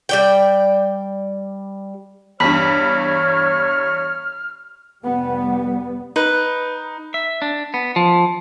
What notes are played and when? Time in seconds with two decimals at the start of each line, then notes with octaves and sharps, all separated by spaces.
0.09 G3 D5 G5
2.40 E2 G2 C#5 B5 F6 B6
5.04 F1 G3 B3
6.16 D#4 B4
7.14 E5
7.42 D4
7.74 B3
7.96 F3